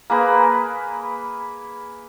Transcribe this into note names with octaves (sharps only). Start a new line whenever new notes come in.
A#3 G#4 B4